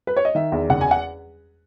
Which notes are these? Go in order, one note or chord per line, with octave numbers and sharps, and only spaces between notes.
B4
C#5
D#5
D#3 E5
E2
F#1 F#5
G#5
F#5